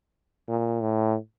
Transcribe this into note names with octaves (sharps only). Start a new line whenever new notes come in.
A#2
A2